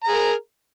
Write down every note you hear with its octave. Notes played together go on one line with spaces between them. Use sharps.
G#4 A#4 A#5